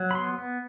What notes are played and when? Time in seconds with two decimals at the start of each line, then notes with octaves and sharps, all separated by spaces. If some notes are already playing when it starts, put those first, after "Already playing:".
Already playing: F#3
0.11 B5
0.15 B3 C6
0.38 B3